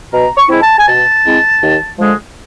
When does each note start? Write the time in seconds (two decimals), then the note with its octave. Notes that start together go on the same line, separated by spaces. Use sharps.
0.12 B2 A#5
0.36 C#6
0.49 G#3 C4 E4
0.62 A5
0.78 G#5
0.87 B2 A5
1.25 G#3 C4 E4
1.62 D#2
1.99 D3 F3 G#3